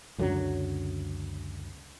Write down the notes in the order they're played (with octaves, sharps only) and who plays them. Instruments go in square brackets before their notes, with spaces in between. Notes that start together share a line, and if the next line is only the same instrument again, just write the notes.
[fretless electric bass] C#2 F#2 D3 F#3